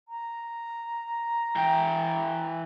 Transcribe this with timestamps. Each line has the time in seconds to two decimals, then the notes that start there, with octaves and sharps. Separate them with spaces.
0.08 A#5
1.56 E3 G5